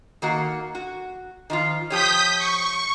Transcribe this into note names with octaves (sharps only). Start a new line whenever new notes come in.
D#3 A#3 F#4
F#4
D#3 F3 F4
F3 G4 C#5 D#6 G6 B6
C#6